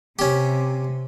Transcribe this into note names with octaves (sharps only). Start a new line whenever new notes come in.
C3 C#4 G4